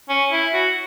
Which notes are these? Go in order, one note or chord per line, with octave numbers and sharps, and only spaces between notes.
C#4
E4
F#4